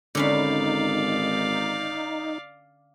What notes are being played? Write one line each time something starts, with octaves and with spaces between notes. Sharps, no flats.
G#1 D3 C#4 D#4 D5 F5 B5